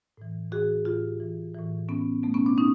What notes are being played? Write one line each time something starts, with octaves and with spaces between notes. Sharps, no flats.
A2 E3
A2 E3 F#4 G#4
A2 E3 F4 G4
A2 E3
A2 E3
A2 E3 B3 C#4
B2 A3 B3
B3 C#4
C4 D4
B2 C#4 D#4